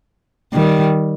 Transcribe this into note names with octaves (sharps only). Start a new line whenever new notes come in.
D#3 G3